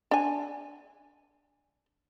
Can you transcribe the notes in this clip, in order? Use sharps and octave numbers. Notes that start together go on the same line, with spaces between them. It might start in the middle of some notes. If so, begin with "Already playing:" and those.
D4 G#5